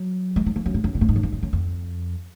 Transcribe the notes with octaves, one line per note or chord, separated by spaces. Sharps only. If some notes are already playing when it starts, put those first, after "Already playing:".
Already playing: F#3
G#3
F#3
F3
F#2
G#2
F#2
B2
A2
G#2
F#2
F2
F#2
F#2
F2